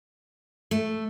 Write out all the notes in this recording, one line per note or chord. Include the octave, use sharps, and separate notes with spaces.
A3